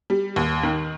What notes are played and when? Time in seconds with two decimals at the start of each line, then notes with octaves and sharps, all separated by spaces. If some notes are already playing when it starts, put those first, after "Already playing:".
0.10 G3
0.36 D#2
0.63 D#3